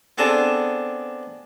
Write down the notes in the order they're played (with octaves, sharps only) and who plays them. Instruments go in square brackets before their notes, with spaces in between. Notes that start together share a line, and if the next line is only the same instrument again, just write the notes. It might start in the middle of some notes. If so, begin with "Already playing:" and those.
[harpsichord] B3 C4 D4 G#4 A4